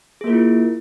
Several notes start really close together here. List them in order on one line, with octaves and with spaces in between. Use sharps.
G#4 A#3 A#4 F4 E4